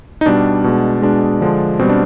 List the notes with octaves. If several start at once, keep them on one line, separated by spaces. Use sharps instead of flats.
D#4
B2 G3 D4
B2 G#3
B2 G#3 D4
D3 F3 G#3
B2 G3 C4
D4